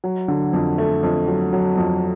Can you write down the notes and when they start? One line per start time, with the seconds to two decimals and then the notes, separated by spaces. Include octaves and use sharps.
0.04 F#3
0.28 D3
0.53 F2
0.78 A3
1.03 F2
1.28 F#3
1.53 F#3
1.77 F2